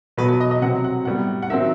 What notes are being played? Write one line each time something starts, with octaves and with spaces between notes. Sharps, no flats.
B2 F#3 B3 B4
B4
D#5
D#5
C3 F#3 C4 F#5
F#5
A2 G3 B3 F#5
F#5
D#3 F#3 C4 E5